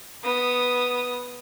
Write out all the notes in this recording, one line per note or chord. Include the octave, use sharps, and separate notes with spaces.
B3 D#6